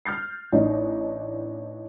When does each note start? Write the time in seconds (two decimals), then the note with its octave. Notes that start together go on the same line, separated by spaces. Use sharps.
0.05 F6 G6 A6 C7
0.52 A1 D4 D#4